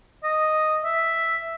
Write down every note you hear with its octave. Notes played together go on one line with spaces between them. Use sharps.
D#5
E5